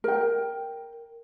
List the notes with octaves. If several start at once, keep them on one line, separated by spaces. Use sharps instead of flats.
A#4 G5